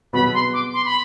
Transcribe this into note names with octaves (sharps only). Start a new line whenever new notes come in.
B2 F#3 B3 F#4 B4 B5
C6
D6
C6
B5